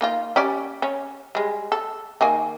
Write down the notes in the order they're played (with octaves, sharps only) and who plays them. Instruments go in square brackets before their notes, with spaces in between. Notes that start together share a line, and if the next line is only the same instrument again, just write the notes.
[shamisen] A#3 D#4 F4
C#4 G4 D5
C#4
G3 G#3
A4
D#3 A#3 G#5